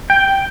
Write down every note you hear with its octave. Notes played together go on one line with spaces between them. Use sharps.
G5